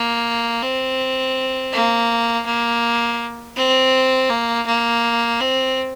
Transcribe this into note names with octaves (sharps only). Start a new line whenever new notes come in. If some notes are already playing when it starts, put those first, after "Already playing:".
Already playing: A#3
C4
A#3
A#3
C4
A#3
A#3
C4